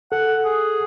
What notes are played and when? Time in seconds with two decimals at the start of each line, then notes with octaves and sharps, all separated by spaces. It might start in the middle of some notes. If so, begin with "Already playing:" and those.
0.12 A4 F#5
0.45 G#4